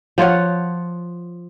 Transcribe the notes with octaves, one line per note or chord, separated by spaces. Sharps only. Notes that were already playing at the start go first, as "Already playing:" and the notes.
F3 F4 C#5 F#5